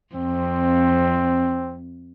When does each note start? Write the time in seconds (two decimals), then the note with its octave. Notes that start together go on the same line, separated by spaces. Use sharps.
0.15 F2 C4